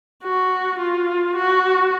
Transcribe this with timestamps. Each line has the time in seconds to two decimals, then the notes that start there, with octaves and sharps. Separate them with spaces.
0.24 F#4
0.80 F4
1.36 F#4